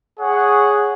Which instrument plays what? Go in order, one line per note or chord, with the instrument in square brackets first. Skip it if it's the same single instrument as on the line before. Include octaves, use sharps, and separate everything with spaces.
[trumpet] G#4 [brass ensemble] C#5 F#5